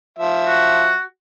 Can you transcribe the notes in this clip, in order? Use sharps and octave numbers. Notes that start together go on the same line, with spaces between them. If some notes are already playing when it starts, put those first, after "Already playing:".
F3 E5
F#4